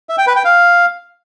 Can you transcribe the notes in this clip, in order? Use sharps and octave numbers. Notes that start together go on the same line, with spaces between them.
E5
G5
B4
G5
F5